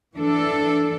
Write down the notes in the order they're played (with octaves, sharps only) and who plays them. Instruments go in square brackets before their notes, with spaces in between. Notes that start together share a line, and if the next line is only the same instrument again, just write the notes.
[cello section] E3 D4 A4